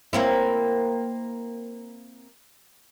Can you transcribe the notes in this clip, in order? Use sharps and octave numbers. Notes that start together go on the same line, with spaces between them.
A#3 C4 E4